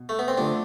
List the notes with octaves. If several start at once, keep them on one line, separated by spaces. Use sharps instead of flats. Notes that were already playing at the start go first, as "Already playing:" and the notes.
Already playing: B2
A3
B3
C4
D3 F3 A3 D4